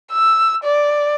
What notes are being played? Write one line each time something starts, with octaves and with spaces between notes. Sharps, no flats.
E6
D5